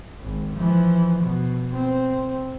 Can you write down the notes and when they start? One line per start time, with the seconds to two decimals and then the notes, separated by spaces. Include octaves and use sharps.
0.21 G#1
0.53 E3 F3
1.19 B2
1.73 C4